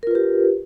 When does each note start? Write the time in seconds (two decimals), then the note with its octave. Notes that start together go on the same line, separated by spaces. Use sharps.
0.03 A#4
0.07 F4
0.11 B4
0.15 G4